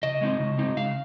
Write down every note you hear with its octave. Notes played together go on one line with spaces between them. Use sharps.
C#3 D#5
G#3 C4 D#4
C#3
G#3 C4 D#4
C#3 F5